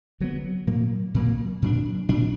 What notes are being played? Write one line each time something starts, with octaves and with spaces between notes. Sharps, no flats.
D3 F#3 B3
A#2 F#3 A#3
A#2 F#3 A#3
A#2 F#3 D4
A#2 F#3 D4